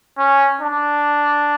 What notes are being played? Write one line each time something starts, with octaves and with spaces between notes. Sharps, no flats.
C#4
D4